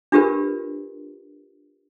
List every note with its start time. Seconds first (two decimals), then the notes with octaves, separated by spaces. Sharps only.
0.12 D4 F4 G4 A#4 B4